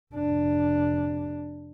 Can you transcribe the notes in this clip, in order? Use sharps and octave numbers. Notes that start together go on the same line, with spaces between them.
F1 D4